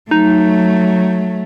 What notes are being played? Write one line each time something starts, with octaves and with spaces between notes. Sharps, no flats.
F#3 A3 D#4